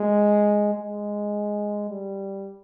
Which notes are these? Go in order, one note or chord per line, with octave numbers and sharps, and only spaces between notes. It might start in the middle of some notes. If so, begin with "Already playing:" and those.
Already playing: G#3
G#3
G3